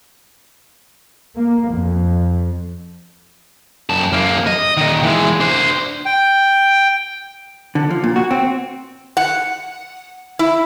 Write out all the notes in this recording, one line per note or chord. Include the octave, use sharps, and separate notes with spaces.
A#3
F2
F#2 A5
F#2 A#3
D#5
A#2 D#3
E3 G#3
D4 C5
G5
D3
F3
A#2
F#4
C4
F#5
E4